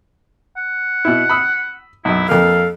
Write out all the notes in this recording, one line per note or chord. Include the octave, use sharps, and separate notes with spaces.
F#5
B2 E4
B5 D#6 E6
B1 F#2 E4
F2 A#3 A4 F5